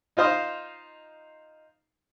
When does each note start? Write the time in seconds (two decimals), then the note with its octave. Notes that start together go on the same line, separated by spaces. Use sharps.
0.17 D#4 F4 C5 D#5 F5